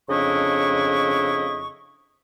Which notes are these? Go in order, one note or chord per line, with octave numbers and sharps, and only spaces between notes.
F2 C#3 D4 E4 D#5 C#6